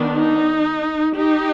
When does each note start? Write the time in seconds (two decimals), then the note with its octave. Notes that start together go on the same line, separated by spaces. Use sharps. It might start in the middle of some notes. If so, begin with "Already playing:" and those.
Already playing: D#3 B3 D4
0.16 D#4
1.17 D#4 G4